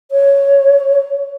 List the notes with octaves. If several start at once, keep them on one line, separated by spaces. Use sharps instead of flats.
C#5